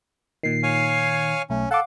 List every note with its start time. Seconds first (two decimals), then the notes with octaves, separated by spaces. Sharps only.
0.43 A#2 D#3 C7
0.63 C#5 F5 G#5
1.50 B1 A3 C#4
1.71 A4 F5 F#5 D6